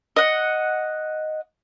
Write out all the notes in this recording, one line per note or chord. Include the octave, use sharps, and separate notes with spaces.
D#5 F#5